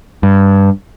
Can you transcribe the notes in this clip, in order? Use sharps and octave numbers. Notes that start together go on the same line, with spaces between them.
G2